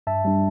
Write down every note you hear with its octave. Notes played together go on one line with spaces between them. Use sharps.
G2 E5 A5
G3 D4